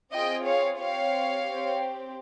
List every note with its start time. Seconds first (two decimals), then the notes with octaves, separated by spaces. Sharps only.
0.13 C4 F4 G#4 D#5 G5
0.46 C#5 F5
0.79 C4 G4 C#5 F5
1.45 C4 G4